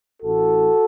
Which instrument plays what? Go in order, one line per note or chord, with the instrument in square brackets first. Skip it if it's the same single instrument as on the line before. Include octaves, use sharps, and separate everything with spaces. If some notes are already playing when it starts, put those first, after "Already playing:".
[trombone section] A1 A2 E3 F#4 A4